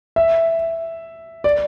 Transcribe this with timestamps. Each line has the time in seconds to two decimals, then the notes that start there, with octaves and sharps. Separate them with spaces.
0.16 E5
1.44 D5